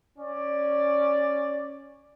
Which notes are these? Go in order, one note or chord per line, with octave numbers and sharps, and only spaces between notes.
C#4 D5